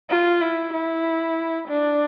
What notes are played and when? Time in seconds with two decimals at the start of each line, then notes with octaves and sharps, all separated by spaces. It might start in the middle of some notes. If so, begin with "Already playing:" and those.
0.10 F4
0.41 E4
0.73 E4
1.68 D4